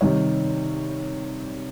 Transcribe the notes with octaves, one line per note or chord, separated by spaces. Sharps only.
C3 D#3 G3 C#5